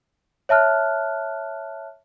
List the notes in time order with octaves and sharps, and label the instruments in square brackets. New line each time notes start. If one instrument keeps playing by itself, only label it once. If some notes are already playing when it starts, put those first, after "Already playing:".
[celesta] C#5 E5 A5 F6 F#6